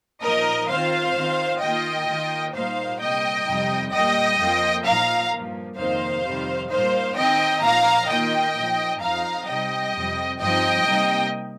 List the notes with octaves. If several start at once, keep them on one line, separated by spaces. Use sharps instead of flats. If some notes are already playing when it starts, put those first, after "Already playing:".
A#2 F3 D#4 A#4 D#5
D#3 C4 F4 C5 F5
D#3 C4 F4
D#3 A#3 F4 D#5 G5
D#3 A#3 F4
A#2 G3 A#3 D#4 C5 F5
C3 G3 A#3 D#5 G5
F2 C3 G3 D#4
A#2 G3 A#3 D#5 G5
F2 F3 A#3 F4
A#2 F3 D#4 F5 A#5
G2 F3 A#3
F2 C3 D#3 A#3 D#4 C5 F5
F2 C3 D#3 G3
A#2 G3 A#3 D#4 C5 F5
D#3 C4 D#4 D#5 G5
A#2 F3 D#4 F5 A#5
D#3 A#3 F4 D#5 G5
A#2 F3 D#4
F2 F3 D#4 F5 A#5
C3 G3 D#4 D#5 G5
F2 C3 G3
G2 F3 C4 D#4 D#5 G5
C3 G3 A#3 D#4